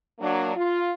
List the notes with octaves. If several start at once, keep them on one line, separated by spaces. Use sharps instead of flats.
F#3 A#3 D4
F4